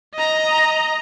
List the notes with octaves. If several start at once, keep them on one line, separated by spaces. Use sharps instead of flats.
D#5 A#5